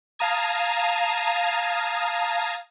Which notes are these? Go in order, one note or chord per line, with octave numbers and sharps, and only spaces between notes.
F5 A5 A#5 D#6 G#6